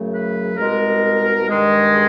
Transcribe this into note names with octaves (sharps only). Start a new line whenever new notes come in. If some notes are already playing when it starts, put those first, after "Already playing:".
Already playing: F#2 C#3 F#3 A3
B4
C2 B2 G#3 A#4
G2 D#3 G#3
G#4